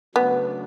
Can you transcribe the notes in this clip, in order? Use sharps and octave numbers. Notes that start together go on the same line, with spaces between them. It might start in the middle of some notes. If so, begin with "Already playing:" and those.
C#3 F#3 A3 B3 D4